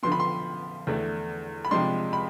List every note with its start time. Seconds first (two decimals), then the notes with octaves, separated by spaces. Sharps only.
0.03 D3 F3 B3 C6
0.12 B5
0.20 C6
0.87 E2 D3 A3 D4
1.65 B5
1.71 C3 F3 G#3 D4 C6
2.13 B5